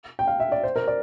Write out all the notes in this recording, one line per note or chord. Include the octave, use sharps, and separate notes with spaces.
G5
F5
E5
D5
C5
A#4
D5